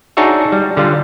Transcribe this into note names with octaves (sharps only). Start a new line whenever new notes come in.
D4 D#4 F#4 G#4 C#5 E5
G3
D3 G3 F4